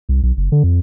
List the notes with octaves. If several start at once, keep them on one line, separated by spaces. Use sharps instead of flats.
C2
B1
F#1
D3
F2